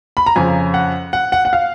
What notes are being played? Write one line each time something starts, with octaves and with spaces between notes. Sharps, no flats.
B5
A#5
F2 C#3 F3 G#5
F#5
F#5
F#5
F#5
F5